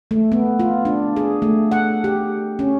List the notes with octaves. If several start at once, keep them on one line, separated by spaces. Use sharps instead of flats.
A3
B3
F4
D4
G#4
A3
F#5
G4
C#4